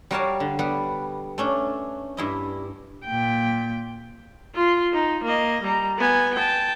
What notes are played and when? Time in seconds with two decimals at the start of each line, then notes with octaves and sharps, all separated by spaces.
0.11 G3 F#4 A#4 C#5 F5 A5
0.40 D3
0.59 G3 B3 B4
1.38 A3 C#4 D4
2.17 G2 E4 D#5
3.05 A#2 G5
4.55 F4 C6
4.93 D#4
5.24 A#3 D#5
5.62 G3 A#5
5.98 B3 G#5
6.35 G5 A5